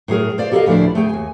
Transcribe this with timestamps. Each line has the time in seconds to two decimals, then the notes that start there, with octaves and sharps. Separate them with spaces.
0.08 A2 F#3 G#4 A#4
0.38 C5 D5 F5
0.52 G4 A4 A#4 C#5 D#5 F5
0.66 D2 A2 F3 D4 E4 D5
0.95 A3 G#4 G5
1.09 D#2 G#5